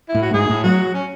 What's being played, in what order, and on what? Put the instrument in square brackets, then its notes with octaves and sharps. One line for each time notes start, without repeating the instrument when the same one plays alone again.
[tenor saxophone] E4
[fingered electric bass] A2
[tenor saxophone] F#4
[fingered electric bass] G#2 [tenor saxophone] G#4
[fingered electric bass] A2
[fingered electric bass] F#3 [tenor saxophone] F#4
[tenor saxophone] C#4